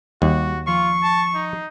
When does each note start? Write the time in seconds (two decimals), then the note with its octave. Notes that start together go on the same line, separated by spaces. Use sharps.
0.22 D#2 G3 F#4
0.67 F3 F4 C#6 C7
1.04 A5
1.35 D#4